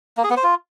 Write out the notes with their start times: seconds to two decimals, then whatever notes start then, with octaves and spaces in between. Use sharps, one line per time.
0.17 A#3
0.24 G#4
0.30 B3
0.37 C5
0.43 F4